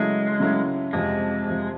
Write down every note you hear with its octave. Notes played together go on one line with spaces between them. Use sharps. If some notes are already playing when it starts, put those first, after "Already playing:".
Already playing: C#3 F#3 G#3 A3 C#4 E4
C#3 F#3 A3 C#4 E4
F2 C3 F3 G#3
F2 C3 F3